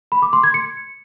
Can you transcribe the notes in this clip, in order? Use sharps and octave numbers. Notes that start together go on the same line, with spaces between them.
B5
D6
C6
G#6
C#7